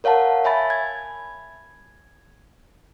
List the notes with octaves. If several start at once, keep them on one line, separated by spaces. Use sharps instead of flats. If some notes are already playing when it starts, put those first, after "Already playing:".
A#4 C#5 F5 F#5 A5
C#5 E5 G#5 B5 A6
G#6